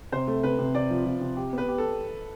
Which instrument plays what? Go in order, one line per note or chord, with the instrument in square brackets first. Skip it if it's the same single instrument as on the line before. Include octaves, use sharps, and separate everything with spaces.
[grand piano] C3 [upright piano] C5
[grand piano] A3
[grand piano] C3 [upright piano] B4
[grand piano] C3
[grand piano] C3 [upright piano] D5
[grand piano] F3
F3
C3
G4
[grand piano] B3 [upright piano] B4
[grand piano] G4
[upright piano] A4